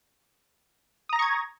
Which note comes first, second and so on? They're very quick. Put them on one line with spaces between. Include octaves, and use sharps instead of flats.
D#6 A#5 A#6 C#6 G#6